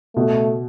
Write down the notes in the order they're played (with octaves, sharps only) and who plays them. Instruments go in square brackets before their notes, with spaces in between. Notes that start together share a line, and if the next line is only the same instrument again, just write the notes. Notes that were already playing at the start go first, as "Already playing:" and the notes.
[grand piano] B2 [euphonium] A3